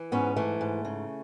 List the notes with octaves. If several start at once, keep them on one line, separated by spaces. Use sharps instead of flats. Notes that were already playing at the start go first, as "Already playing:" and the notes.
Already playing: E3
G#2 B3 C#4
E3 A3
G#2
C#3